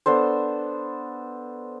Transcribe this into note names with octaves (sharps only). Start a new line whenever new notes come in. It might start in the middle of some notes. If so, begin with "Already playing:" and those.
B3 D4 A4 C5